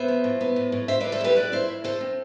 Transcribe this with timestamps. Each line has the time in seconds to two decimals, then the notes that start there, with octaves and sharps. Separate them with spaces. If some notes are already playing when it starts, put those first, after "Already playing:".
Already playing: B3 C5 E5
0.08 F3
0.24 A2
0.41 B3
0.56 A2
0.72 A2
0.88 A2 C5 E5
1.00 A2 B4 D5
1.12 A4 C5
1.20 E4 G4 B4
1.36 F3 B4 D5
1.52 E4 C5 E5
1.68 A2
1.84 A2 A4 C5
2.01 C4